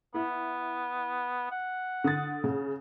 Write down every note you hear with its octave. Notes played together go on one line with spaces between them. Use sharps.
B3 E4
F#5
D3 D#6 A6
C#3